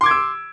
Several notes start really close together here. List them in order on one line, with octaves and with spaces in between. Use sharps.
C6 D6 G#6 D7 E6